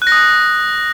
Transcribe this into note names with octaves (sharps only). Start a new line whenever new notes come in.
F#6
A#6
D#6
F#6